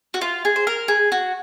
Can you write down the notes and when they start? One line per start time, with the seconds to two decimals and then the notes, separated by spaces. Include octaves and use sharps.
0.14 F#4
0.21 F4
0.45 G#4
0.56 C5
0.67 A#4
0.88 G#4
1.12 F#4